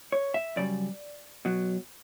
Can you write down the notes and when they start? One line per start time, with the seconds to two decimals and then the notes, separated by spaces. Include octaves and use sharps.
0.12 C#5
0.34 E5
0.56 F#2 C#3 G3 D5
1.45 B2 F#3